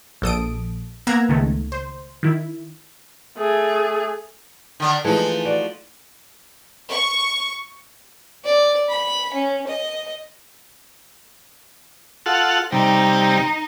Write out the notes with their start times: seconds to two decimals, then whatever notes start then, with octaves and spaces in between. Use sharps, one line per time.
0.22 A#1 A4 D#6 D7
1.07 A#3 B3 A#5 E6 F#6 G#6
1.29 C#2 D#3 A3
1.72 C5
2.23 D#3 E4
3.38 A3 G#4
4.80 D3 D4
5.05 E3 F3 G#3 A3 D#4
5.45 F#4 D5
6.89 C#6
8.45 D5
8.89 B5
9.34 C#4
9.67 D#5
12.26 F4 A4 F#5
12.72 C3 G3 D#4